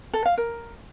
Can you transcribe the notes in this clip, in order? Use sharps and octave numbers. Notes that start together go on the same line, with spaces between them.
A4
F5
A#4